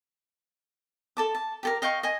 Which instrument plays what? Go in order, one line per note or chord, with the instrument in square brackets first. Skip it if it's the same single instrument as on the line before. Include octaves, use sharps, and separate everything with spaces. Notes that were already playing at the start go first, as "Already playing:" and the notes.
[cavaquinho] A4 A5 D6
A5
G4 A4 A#4
D#5 F5 G5 C#6
D#5 G#5